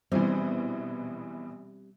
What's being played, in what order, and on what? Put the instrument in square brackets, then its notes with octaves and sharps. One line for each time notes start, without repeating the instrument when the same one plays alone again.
[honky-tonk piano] A#1 B2 E3 [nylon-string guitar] G3 C4